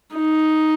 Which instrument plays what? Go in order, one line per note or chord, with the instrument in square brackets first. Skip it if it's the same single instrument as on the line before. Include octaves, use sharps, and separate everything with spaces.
[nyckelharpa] D#4